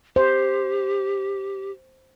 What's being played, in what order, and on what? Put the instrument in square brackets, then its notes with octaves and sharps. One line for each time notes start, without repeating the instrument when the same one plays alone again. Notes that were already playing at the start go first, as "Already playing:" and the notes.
[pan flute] G4 [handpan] C5